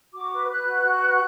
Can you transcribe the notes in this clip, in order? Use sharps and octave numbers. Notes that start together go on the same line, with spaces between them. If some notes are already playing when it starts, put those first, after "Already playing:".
F#4 D6
B4
B4 F#6
F#4
F#4
B4